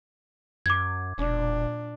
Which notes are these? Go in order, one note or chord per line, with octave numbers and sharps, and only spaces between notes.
F#2 D6 G#6
E1 A#2 D4